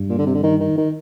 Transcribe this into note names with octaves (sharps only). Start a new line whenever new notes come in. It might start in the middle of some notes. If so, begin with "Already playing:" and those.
Already playing: G2
A#2
D3
C3
D3
D#3
D#3
D#3